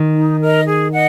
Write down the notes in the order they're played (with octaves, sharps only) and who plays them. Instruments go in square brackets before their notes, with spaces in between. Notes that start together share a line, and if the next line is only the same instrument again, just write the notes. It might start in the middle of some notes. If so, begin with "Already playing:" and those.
Already playing: [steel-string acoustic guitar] D#3
[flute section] D#4
A#4 D#5
G#4
D#5 F#5